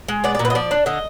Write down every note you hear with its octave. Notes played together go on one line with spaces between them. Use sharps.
G#3
B3 D5
D5
A#2
B4
D#5
F3 D5
D4
D3 D#5